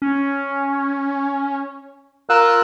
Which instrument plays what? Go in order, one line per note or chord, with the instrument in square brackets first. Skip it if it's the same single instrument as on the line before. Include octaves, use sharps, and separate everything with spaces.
[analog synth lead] C#4
[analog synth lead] F4 [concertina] A#4 E6 F#6